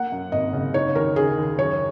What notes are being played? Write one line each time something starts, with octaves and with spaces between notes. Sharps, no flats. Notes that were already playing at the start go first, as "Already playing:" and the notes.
Already playing: A#3 F#5
F#2
G#1 D#5
C#3
D#4 C#5
D#2 A#4
C#3 G#4
D#2
F#2 C#5